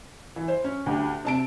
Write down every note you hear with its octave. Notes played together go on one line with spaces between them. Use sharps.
E3
C5
C#4
D2 G4
C3 A5 D7